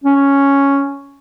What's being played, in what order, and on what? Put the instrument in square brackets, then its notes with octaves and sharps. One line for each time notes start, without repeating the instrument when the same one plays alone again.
[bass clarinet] C#4